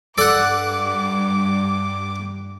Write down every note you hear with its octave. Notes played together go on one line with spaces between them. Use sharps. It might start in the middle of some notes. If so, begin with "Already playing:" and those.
G2 A4 D5 F#5 D6 E6 D7